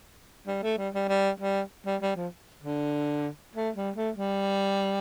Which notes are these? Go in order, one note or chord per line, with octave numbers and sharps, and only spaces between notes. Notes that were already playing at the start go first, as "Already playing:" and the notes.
G3
A3
G3
G3
G3
G3
G3
G3
F3
D3
A3
G3
A3
G3